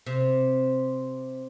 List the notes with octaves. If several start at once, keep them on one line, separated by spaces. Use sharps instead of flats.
C3